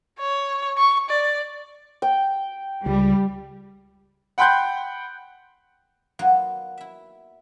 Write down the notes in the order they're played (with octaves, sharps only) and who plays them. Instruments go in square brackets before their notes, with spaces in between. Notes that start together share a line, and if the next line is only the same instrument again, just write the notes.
[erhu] C#5
C#6
D5
[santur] G5
[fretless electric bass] C#2 [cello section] G3
[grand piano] F#5 G5 B5 C6 F#6 G6
[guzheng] F#3 A#3 B3 D#4 F4 F#4
E4 E5